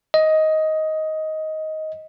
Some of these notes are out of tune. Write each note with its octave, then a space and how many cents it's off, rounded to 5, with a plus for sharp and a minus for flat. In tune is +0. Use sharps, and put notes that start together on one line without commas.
D#5 +10